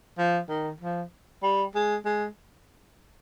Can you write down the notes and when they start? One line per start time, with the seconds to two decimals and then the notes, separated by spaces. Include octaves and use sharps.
0.18 F3
0.49 D#3
0.81 F3
1.43 G3
1.75 G#3
2.05 G#3